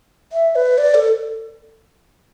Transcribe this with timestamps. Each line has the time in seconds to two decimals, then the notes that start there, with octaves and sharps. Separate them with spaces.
0.32 E5
0.55 B4
0.78 D5
0.94 A4